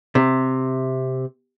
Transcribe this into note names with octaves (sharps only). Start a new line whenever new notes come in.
C3